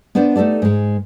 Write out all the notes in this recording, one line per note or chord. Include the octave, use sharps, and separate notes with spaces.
B3 D4 B4 C5 D5
A3 D#4 G4 A4 D5
G#2 G#3